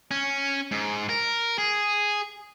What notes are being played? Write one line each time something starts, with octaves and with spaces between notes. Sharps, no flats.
C#4
G#2
A#4
G#4